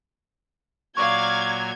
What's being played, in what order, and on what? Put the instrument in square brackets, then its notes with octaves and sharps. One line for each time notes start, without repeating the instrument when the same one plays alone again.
[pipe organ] A#2 F#3 F6 [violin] D5 F5 [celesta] C#6 [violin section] G#6